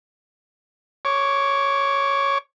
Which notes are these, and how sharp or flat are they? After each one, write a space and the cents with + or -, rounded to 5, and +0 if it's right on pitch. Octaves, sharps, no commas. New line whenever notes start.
C#5 +0 D6 -20